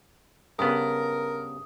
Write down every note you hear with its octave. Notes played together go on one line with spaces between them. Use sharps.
G2 C#3 B3 A#4 D#6